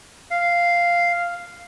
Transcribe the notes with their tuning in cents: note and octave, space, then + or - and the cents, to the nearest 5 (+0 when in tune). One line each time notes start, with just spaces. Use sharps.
F5 -5